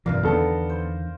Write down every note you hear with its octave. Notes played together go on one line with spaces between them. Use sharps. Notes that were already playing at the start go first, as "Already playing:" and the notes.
F#2 B2 E3 A#4 D5 F5
E2 D3 D#3 B3 A4
C5